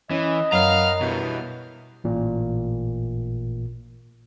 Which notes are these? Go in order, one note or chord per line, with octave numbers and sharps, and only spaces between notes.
E3 C#4 D#5
F#2 B3 F5 A#5
G2 B2 E3
A1 A#2